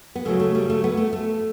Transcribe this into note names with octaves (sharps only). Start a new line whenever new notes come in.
B3
C#3 F#3 A3
A3
G3
A3
B3
A3
A3